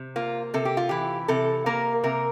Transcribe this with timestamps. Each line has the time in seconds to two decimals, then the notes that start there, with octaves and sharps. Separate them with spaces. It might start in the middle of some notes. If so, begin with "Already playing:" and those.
Already playing: C3
0.16 A#3 F4
0.54 C3 A4
0.65 G4
0.77 F4
0.89 E3 G4
1.28 C3 A4
1.66 A#3 A#4
2.04 C3 A#4